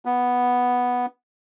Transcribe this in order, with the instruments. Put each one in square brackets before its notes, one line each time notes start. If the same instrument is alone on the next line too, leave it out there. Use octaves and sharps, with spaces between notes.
[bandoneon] B3